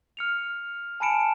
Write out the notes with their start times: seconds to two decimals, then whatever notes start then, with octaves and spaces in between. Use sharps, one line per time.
0.17 F6 C#7 F7
1.00 G#5 A5 B5 C#7 D7 E7